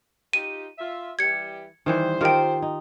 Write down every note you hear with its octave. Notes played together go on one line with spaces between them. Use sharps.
D#4 F4 G4 D#7
F4 E5
E3 G3 G4 G#6 C#7
D#3 E3 G3 C5
D#3 F4 G4 A#4 G5
D#4